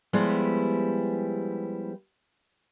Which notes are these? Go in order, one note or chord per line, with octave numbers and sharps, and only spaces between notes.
F3 G3 G#3 B3 E4 G4